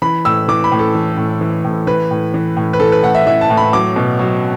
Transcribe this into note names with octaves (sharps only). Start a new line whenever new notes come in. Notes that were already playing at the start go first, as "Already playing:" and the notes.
E3 B5
A2 E6
E3 D6
B5
A2
A4
E3
A2
E3
A2
E3 B4
A2
E3
A2
B4
E3 A4
B4
A2 F#5
E5
E3 E5
A5
A2
B5
F#3 D6
B2
F#3